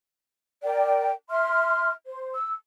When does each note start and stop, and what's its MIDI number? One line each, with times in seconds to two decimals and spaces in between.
0.63 1.11 70
0.63 1.11 74
0.63 1.11 79
1.30 1.91 76
1.30 1.91 84
1.30 1.91 89
2.06 2.33 72
2.34 2.52 88